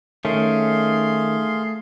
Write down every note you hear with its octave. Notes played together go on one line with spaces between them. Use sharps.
D#3 A3 C#4 G#4 F5 C6